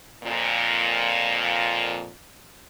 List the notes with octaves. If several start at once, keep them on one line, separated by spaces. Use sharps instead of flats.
F2 A#2